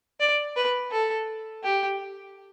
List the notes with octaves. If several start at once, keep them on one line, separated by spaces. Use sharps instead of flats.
D5
B4
A4
G4